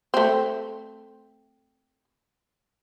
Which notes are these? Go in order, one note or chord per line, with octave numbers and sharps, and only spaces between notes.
A3 C4